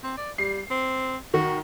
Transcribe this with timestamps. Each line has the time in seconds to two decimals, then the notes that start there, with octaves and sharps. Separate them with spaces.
0.04 C4
0.17 D5
0.38 G3 C7
0.71 C4
1.34 D#3 F#4